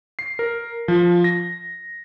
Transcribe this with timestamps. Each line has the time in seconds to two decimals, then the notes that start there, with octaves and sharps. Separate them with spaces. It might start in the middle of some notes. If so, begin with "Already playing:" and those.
0.19 C7
0.39 A#4
0.88 F3
1.24 A#6